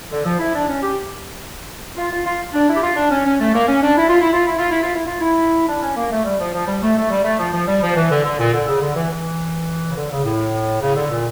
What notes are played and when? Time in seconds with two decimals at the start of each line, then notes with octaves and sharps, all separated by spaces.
0.11 D3
0.26 F3
0.39 E4
0.55 D4
0.68 C#4
0.83 G4
1.97 F4
2.11 F4
2.25 F4
2.54 D4
2.69 E4
2.76 G4
2.83 F4
2.96 D4
3.11 C#4
3.26 C#4
3.40 A3
3.54 A#3
3.68 C#4
3.82 D4
3.97 E4
4.08 F4
4.21 E4
4.33 F4
4.46 E4
4.59 F4
4.71 E4
4.83 F4
4.95 E4
5.07 F4
5.20 E4
5.68 D4
5.82 C#4
5.96 A#3
6.11 A3
6.24 G3
6.40 F3
6.54 F3
6.67 G3
6.83 A3
6.97 A3
7.11 G3
7.24 A3
7.39 F3
7.53 F3
7.67 G3
7.83 F3
7.96 E3
8.11 D3
8.25 D3
8.39 A#2
8.53 D3
8.68 C#3
8.82 D3
8.96 E3
9.10 E3
9.90 C#3
9.95 D3
10.11 C#3
10.25 A2
10.82 C#3
10.96 D3
11.11 A#2